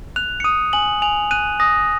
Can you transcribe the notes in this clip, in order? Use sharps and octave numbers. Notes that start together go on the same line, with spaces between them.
F#6 F7
C#7
D#6 D#7
G#5 F#7
G#5 F7
F#6 D#7
D#6 A#6